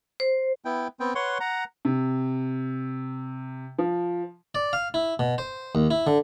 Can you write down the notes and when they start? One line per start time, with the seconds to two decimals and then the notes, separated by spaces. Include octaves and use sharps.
0.20 C5
0.65 B3 E4 G5
1.00 B3 C4 G5
1.15 B4 C#5 F#5 C6 C#6
1.40 F#5 A#5
1.85 C3
3.78 F3
4.55 D5
4.73 F5
4.94 E4
5.19 B2
5.38 C5
5.75 D#2
5.91 E4
6.07 D3